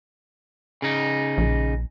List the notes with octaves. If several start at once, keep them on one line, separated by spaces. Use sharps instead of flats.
C#3 D#4
A#1